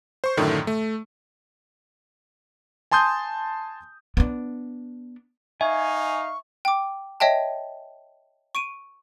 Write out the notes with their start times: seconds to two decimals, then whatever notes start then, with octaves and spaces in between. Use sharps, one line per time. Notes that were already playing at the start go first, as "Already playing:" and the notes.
0.24 C5 C#6
0.37 F#2 A2 D3 D#3
0.67 A3
2.91 G#5 A5 C6 D#6 G6
4.17 B3 D4
5.61 D#4 E5 F5 G#5 C#6
6.65 G5 D6
7.20 C#5 D#5 E5 G5 A5
8.55 C#6 D7 D#7